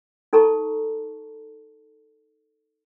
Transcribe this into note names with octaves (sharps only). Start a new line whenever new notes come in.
D#4 A4 A5 A#5 C#6